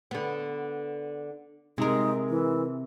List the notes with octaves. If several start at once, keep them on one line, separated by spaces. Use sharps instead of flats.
D3 B3
C3 G#3 D#4 A#4
E3